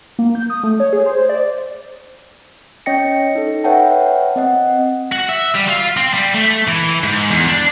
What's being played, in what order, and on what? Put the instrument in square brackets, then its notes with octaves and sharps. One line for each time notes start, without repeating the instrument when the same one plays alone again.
[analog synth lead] A#3
G6
D#6
A3
C#5
G#4
C5
D5
[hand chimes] C#4 C#5 D#5 G5 A#6 C#7
D#4 A4
B4 C#5 E5 F#5 G5 A5
C4 D#5 F#5
[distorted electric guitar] F#4
E5
G3
F4
C4
G3
A3
E3
G#2
E2
D4